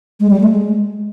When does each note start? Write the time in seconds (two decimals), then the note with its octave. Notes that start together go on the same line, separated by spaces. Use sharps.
0.20 G#3
0.30 G3
0.40 A3
0.50 G#3